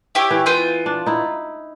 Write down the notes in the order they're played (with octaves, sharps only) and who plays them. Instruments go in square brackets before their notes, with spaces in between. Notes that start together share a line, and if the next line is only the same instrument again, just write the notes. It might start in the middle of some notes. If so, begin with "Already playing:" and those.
[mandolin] E4 G4 C#5
[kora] E3
[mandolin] B3 F4 G6
[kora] D4
D#4 E4